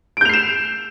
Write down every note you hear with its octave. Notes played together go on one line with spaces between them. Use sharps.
G6 C7 D7 E7 F7